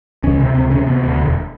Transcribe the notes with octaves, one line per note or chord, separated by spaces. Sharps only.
C#2 C#4
C3
C#2 C4
C3 C#4
C3 B3
D2
E1